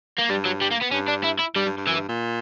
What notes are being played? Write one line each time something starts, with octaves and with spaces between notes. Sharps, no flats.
A#3
G2 G3
F#3
G3
A#3
B3
G2 C#4
D4
E4
E4
G2 G3
G2
G2
F#2 E3
G2
A#2